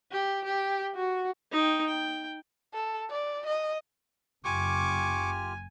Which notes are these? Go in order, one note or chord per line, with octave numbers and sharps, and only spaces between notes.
G4
G4
F#4
D#4 G5
G5
A4
D5
D#5
F#1 F4 G4 G#5 C#6 D6 F6